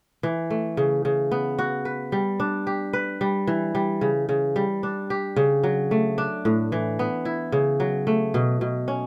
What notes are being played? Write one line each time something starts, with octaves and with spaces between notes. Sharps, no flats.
E3
A3
C#3
C#3
B3
F#4
B4
G3
D4
G4
B4
G3
E3
G3
C#3
C#3
G3
D4
G4
C#3
F#3
A3
D4
A2
E3
B3
E4
C#3
F#3
A3
B2
B2
C#4